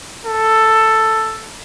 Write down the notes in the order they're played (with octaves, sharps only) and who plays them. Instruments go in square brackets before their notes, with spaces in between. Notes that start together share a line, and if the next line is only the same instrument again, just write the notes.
[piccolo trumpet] A4